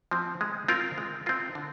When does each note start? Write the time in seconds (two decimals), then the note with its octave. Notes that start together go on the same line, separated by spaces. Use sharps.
0.11 F3 C4
0.41 G#3
0.68 C4 F4 A#4
0.98 G#3
1.26 C4 F4 A#4
1.55 D3